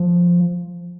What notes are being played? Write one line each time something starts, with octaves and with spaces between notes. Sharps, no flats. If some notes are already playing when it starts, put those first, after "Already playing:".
Already playing: F3